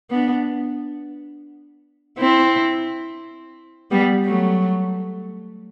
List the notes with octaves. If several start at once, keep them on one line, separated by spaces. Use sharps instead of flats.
B3 D4
C4 E4
G3 B3
F#3 A3